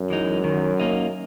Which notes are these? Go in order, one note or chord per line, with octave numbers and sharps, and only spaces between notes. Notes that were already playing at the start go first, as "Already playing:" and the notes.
Already playing: F#2
E3 G#3 D#4
D#3
A#3 D#4